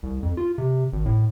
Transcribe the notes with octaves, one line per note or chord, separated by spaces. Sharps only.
C2
F2
F4
C3
G#1
A2